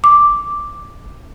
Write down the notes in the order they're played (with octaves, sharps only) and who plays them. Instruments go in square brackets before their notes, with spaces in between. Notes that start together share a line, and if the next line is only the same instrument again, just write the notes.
[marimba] D6